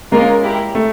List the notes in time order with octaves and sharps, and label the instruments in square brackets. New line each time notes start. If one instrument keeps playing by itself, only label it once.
[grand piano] G#3 [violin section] A#3 C#4 F4 A#4
[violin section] E4 G4 A#4
[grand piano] A3